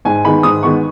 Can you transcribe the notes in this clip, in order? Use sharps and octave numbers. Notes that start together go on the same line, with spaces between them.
G#2 G#5
D#3 G#3 B3 B5
G#2 D#6
D#3 G#3 B3 C#6